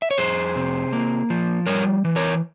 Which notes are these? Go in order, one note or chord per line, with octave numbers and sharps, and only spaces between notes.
E5
C#5
F2 G#4 C5
C3
A#3
F3
G3 A#4 C#5
E3
A#4 C#5